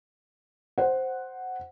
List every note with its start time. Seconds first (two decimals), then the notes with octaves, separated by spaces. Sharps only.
0.78 C5 F#5